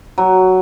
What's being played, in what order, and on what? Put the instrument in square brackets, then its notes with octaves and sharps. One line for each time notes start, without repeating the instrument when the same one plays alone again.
[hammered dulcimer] F#3